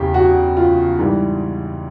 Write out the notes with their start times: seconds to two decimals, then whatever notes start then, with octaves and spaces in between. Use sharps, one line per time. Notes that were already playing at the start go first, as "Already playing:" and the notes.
Already playing: E2 C#3 E3 G4
0.14 F#4
0.57 F4
0.98 G#2 E3 G3